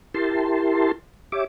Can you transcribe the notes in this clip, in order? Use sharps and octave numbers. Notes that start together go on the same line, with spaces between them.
E4 G4 A#4 A5 C6
G4 C#5 E5 D6